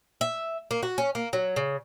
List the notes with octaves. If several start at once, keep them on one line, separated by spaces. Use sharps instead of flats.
E5
A#3
F#4
C#4
A#3
F#3
C#3